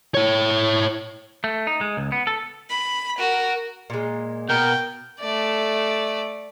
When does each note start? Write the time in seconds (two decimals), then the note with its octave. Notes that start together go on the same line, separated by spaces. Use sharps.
0.15 E4 C#5
1.44 A3
1.67 D#4
1.81 G#3
1.97 C#2
2.12 B3
2.27 A4
2.70 B5
3.18 F#4 A#4
3.90 A#2 G#3
4.49 B2 A#4 G5
5.20 A3 D5